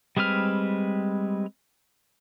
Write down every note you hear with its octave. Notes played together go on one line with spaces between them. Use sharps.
G3 G#3 C4 B4 F6